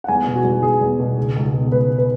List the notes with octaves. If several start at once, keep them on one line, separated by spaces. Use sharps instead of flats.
F#5
E2 G#5
B2
F#4
E2
E2 G#4
E2
B2
C#2
C#2
B2
C#2 B4
B2
B4